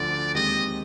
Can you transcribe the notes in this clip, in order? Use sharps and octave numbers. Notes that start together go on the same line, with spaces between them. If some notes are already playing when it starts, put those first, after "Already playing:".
Already playing: D2 D3 F3 D5
D#2 D#3 G#3 C4 G4 D#5